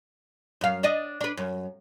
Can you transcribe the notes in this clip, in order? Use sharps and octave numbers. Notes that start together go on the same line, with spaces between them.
F#2 F5
D4 D5 D#5
D4 B4
F#2